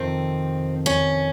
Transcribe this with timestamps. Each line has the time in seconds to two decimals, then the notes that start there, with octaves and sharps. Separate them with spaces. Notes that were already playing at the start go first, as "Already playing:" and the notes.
Already playing: F2 C3 D#3 C4
0.86 C#4